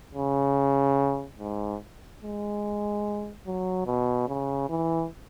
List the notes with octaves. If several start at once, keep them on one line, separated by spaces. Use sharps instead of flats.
C#3
G#2
G#3
F#3
B2
C#3
E3